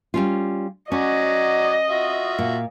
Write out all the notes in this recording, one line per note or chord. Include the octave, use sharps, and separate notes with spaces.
G3 C#4 F4
F#3 C#4 D5 D#5 F#5
F4 F#4 E5
A#2